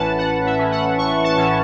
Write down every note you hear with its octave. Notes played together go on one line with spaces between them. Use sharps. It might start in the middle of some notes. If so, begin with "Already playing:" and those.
Already playing: A1 A2 E3 C#4 B4 F#5 A5
A1 F#5
E5
A2 E3 C#4
F#5
A1 C#6
A5
A2 E3 C#4